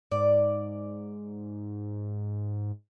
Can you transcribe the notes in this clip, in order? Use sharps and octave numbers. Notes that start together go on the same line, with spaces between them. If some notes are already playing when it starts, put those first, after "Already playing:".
G#2 D5